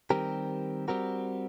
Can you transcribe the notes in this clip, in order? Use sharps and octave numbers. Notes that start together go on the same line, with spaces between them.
D#3 G3 C4 G4 A#4
G3 C4 F#4 A#4